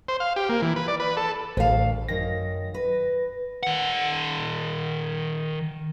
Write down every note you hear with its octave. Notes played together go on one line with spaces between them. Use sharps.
C5
F5
G4
A#3
E3
B4
D5
B4
A4
A1 D2 F5
F#2 D#3 A#6
B4
D#3 F#5